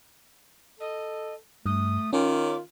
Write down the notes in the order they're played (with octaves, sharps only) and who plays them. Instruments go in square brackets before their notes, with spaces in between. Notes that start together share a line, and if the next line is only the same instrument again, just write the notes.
[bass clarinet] A4 [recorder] D#5
[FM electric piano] G2 [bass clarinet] A3 [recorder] D#6
[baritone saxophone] D#3 [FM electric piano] C#4 [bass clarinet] F4 [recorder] D6